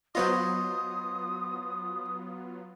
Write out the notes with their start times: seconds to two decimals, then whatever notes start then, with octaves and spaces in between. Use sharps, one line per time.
0.15 F#3 B3 F4 C5 C#5 D#5 D#6